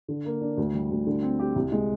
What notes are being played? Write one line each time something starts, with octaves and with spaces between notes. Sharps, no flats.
D3
A#3
D4
D2
G3
D2
D3
C4
G4
C2
G#3